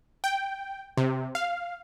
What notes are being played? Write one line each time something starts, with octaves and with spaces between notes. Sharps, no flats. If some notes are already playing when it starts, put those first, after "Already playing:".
G5
C3
F5